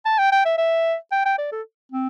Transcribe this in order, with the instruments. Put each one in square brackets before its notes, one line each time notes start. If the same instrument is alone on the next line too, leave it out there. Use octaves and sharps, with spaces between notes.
[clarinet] A5
G5
G5
E5
E5
G5
G5
D5
A4
C4